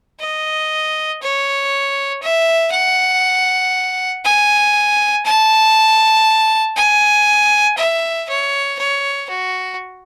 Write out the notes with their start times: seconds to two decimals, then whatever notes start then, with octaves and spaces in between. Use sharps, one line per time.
0.20 D#5
1.21 C#5
2.22 E5
2.72 F#5
4.24 G#5
5.25 A5
6.76 G#5
7.78 E5
8.29 C#5
8.79 C#5
9.29 F#4